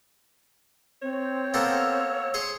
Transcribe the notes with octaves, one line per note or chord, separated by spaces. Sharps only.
C4 C#5
A#3 B3 A4 E6
G#4 C5 C#5 C#6